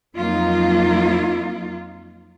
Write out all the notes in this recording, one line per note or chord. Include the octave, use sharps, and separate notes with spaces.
F2 F#3 A#3 D#4 F4